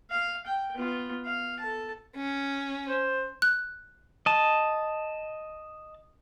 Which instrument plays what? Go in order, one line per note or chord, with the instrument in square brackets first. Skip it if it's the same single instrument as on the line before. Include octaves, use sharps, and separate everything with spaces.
[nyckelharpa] F5
G5
B3 F4
F5
A4 A5
[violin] C#4
[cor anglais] C5
[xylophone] F#6
[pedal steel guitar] D#5 A5